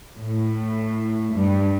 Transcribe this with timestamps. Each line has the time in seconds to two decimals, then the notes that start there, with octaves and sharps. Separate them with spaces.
0.19 A2
1.35 G2